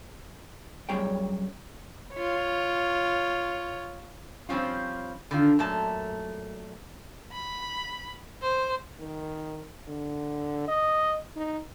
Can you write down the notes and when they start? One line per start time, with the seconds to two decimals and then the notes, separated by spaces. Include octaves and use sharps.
0.89 F#2 G3 B3 G#4 C#5 G5
2.14 F4 C#5
4.49 F3 G3 C4 C#4 F4
5.31 D3 D#3 F4
5.59 F#2 A#2 A3 A5 A#5
7.32 B5
8.42 C5
9.00 D#3
9.88 D3
10.68 D#5
11.36 D#4